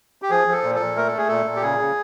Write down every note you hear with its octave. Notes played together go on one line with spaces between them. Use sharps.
G4
F3 G#4
F3 A4
A#2
A4
A#2
A3 A#4
A3 A4
G#4
A#2 A4
A#2
G4
C#3 G#4
C#3